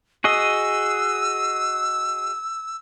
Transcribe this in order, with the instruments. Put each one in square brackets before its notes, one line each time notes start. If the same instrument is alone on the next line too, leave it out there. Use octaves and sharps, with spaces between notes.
[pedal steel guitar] F#4 G#4 D#5 [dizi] E6